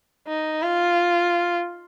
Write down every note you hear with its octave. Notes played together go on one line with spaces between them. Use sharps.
D#4
F4